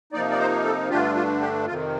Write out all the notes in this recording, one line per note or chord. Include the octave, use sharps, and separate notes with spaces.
C3 F3 A#3 D#4 D5
D5
C5
A4
G2 D3 A3 D4 F4 G4
F4
G4
F2 C3 D#3 F4